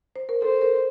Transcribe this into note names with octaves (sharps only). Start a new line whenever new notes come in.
C5
A#4
A4 C5
A#4